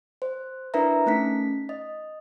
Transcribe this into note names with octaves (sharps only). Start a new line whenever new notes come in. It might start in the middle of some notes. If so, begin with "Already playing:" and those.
C5
D4 E4 A#4 B4 E5 A#5
A3 C#4 D#4 B6
D#5